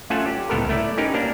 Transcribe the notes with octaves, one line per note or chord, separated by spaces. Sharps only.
A3 C#4 F4 F#5 G#5 A5
G4
C#2 A2 B3 A4 A#4
A3 E4 D5
C#4 D#4 G4 A#4 B4
A#3 D4 A#4